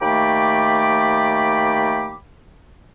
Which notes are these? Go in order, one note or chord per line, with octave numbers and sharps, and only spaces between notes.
D#2 A3 G5 B5 D6